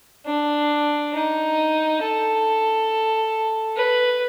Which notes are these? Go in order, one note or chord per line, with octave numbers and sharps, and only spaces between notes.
D4
D#4
A4
B4